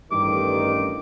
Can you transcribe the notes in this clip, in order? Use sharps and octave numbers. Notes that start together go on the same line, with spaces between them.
A1 G2 D#3 D6